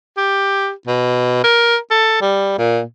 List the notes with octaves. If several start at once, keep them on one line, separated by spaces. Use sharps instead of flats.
G4
B2
A#4
A4
G3
A#2